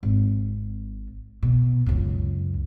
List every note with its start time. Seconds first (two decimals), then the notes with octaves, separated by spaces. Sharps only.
0.03 G#1
1.43 B2
1.86 C#2 F#2